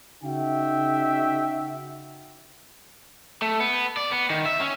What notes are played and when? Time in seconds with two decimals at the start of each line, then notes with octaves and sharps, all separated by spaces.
0.24 C#3 D#4 F#4 E5 G5
3.42 A3
3.60 B3
3.97 D5
4.12 B3
4.30 D#3
4.46 E5
4.60 C#4